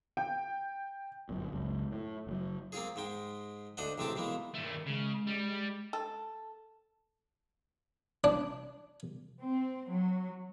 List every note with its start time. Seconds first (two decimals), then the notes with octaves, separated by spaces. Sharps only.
0.17 G5
1.29 G1 F#2 A#2
1.52 F#1 C#2
1.91 A2
2.27 F#1 F#3
2.72 A#3 C4 F4 G#4
2.96 G#2 G#3 G5
3.77 D2 D4 C5 D#5 F#5
3.98 A1 C3 G#3 C4 G4 A5
4.16 B2 E3 G#3 A#3
4.55 G2 D#3 A3
4.87 C#3 G#3
5.27 G3
5.93 A4
8.24 D4
9.41 C4
9.92 F#3